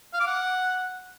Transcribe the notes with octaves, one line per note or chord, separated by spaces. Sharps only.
F5
D6
F#5